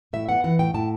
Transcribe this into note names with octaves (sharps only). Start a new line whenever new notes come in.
A2 E5
B3 F#5
E3 F#5
A2 G5
A2 A5